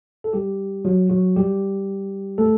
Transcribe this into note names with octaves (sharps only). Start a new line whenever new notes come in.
A4
G3 G4
F#3 F#4
F#3 F#4
G3 G4
A3 A4